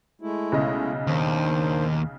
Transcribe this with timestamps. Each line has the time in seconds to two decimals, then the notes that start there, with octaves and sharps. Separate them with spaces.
0.21 G#3 A3 E4
0.52 B1 C#3 D#5
1.07 D#2 D#3 D4 C5